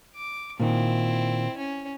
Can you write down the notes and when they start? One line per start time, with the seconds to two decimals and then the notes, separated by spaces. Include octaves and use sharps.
0.16 D6
0.60 A#2 D#3 C4 E4
1.57 C#4